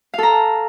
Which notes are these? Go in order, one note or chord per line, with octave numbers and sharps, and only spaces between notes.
A4 F5 A#5